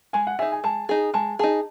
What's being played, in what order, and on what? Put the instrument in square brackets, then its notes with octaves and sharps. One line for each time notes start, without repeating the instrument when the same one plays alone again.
[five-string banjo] G#3 [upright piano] G#5
[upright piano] F#5
[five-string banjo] D#4 G#4 [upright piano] E5
[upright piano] G#5
[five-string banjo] G#3 [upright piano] A5
[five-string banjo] D#4 G#4
[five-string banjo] G#3 [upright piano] A5
[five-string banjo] D#4 G#4 [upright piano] A5